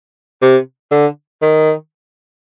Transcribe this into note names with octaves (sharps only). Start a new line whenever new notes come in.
C3
D3
D#3